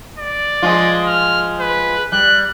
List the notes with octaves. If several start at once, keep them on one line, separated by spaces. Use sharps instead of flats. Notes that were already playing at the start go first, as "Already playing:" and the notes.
D5
F3 G#3 F4
F6
B4
G3 F#6